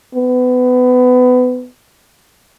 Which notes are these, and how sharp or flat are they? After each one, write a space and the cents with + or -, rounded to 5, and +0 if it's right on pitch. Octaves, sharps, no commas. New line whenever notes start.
B3 +25